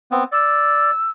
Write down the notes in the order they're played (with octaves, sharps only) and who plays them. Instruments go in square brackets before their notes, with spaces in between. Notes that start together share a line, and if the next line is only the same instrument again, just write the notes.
[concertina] B3 C4
[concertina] D5 [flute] E6